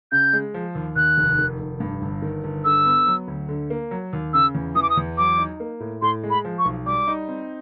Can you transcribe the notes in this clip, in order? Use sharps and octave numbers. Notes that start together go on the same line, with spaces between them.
C#3 G6
G#3
F3
D#2
D#2 F#6
F1
D#3
F1
G2
G1
D#3
G1
D3 E6
B3
F#3
D2
D3
A#3
F#3
D#2
C#3 E6
E2
E3 D#6
D6
D#6
E2
F#3 D6
D#4
A#3
A2
A2 C6
G#3
B5
F3
C#6
B1
G3 D6
D#4
C4